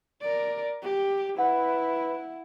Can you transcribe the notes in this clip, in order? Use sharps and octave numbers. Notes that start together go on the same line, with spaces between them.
A#4 D5
G4
E4 B4 F#5